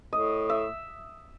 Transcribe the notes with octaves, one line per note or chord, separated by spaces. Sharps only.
A2 D#5
E5